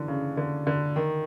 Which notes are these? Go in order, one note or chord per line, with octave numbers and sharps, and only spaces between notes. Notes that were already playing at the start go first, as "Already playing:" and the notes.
Already playing: D3 E3
C#3
D3
D3
D#3